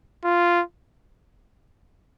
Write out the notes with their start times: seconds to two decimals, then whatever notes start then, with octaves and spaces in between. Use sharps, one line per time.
0.24 F4